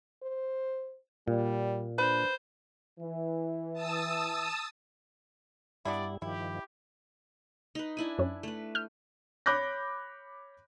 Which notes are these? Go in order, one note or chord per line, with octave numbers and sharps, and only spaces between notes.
C5
A#2 G3
D4 B4 C5
E3
A5 D#6 E6
G2 G3 B3 D4 E4 D5
G2 D#3 F3 E4 G4
D#4 B4
D4 E4 G#5
F#2 C#4
A3 B4
F6 G6
C#5 B5 D6 F#6 G6 A#6